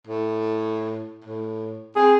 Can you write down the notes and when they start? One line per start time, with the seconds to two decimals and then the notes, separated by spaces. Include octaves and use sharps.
0.07 A2
1.24 A2
1.96 C4 G#4